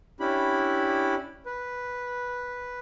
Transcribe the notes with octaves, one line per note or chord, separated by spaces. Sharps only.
C#4 D4 E4 G4 B5
B4